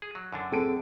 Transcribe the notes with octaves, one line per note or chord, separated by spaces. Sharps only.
G#4
F#3
F#2 D3 D4
C4 G#4 A4 D7